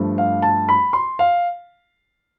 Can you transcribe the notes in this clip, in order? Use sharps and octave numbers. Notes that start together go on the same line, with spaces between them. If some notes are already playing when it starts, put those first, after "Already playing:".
Already playing: G2 F3 A3
F5
A5
B5
C6
F5